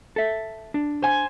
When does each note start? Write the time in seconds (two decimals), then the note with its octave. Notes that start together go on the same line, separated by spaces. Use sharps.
0.16 A4 E5
0.74 D4
1.02 C5 G#5